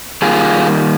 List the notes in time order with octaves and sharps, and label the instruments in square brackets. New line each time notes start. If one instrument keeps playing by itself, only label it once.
[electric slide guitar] D#3 G3 A#3 F4 G#4